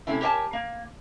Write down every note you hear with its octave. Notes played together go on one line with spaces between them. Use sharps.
C3 A3 C#4 E4
G4 A#4 C#5 E5 G#5 A5
A#3